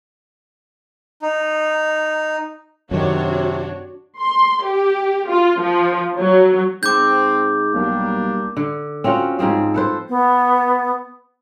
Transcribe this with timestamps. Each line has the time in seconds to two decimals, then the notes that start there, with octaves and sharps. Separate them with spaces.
1.22 D#4
2.91 F#2 C3 D#3 D4 F#4 C#5
4.19 C6
4.64 G4
5.27 F4
5.61 F3
6.16 F#3
6.83 G#2 C4 D6 G6
7.74 B1 G3 A#3 D4
8.57 D3
9.04 C4 C#4 F4 F#4
9.39 G#2 F3 C4 G#4
9.74 A4 B4 C5
10.09 B3